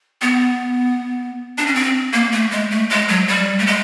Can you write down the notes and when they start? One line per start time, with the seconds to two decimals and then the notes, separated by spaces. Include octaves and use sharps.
0.21 B3
1.58 D4
1.66 C#4
1.75 C4
2.13 A#3
2.32 A3
2.51 G#3
2.71 A3
2.90 G#3
3.08 F#3
3.28 G3
3.59 A3
3.67 G#3